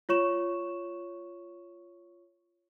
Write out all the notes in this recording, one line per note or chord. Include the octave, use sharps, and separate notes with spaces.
F4 C#5 C#6 E7